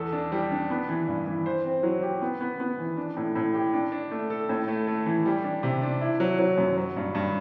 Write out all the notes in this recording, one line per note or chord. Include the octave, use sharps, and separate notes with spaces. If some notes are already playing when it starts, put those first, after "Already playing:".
Already playing: E2 A4
D4
G3
D4
B3
E3
G2
E3
C5
C4
F#3
G4
B3
B3
B3
E3
D4
A2
A2
G4
D4
D4
A3
A4
A2
A3
A3
E3
G3
D4
C3
D4
E4
F#3
F#3
F#2
F#3
G2
G2